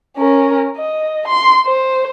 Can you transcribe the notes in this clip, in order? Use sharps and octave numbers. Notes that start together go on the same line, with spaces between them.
C#4 A#4
D#5
C6
C5